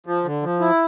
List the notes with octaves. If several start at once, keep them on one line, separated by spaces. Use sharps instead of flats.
F3
D3
F3
E4